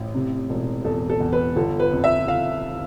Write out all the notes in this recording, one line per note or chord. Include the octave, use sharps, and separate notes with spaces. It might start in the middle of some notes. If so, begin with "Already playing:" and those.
Already playing: A1
C3
E1
E2 A4
A4
E2
B4
G1 A4
B4
F2
E5
G1 F5